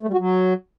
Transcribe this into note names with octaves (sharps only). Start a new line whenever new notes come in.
A3
G3
F#4
F#3